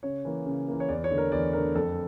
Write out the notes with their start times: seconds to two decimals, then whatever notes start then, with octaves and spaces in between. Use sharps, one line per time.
0.03 C#3 C#5
0.25 E3 A#3
0.46 C#3
0.68 E3 A#3
0.80 C#5
0.89 E2 D5
1.04 C#5
1.11 D3 A3
1.18 A#4
1.32 E2 D5
1.53 D3 A3 A#4
1.75 F2 A4